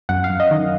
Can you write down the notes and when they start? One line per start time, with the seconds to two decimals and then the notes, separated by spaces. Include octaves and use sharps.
0.09 F#2 F#5
0.24 F5
0.30 F#2
0.40 D#5
0.51 D#3 D#5